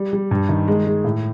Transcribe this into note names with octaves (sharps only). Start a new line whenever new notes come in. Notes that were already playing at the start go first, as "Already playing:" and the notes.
Already playing: G3
G3
G2
D#3
G#3
G#3
A2